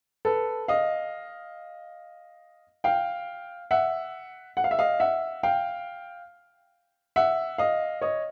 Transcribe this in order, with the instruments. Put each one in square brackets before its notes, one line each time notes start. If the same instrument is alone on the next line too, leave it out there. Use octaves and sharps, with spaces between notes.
[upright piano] A4 B4
D#5 F5
F5 G5
E5 F#5
F#5
F5
E5
D#5 F5
E5 F#5
F5 G5
E5 F#5
D#5 F5
C#5 D#5